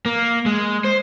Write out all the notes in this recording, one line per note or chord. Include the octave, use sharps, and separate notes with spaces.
A#3
G#3
C5